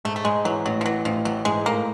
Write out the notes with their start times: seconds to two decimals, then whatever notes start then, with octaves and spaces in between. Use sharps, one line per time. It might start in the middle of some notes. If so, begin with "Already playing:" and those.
0.05 G#2 A3
0.16 A3
0.25 G#2 G#3
0.45 E3 F#3
0.65 A1 F#3
0.81 F3
0.85 E3 F#3
1.05 A1 F3
1.25 E3 F#3
1.45 G#2 G#3
1.66 A2 A#3